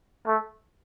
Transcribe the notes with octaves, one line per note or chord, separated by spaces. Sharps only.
A3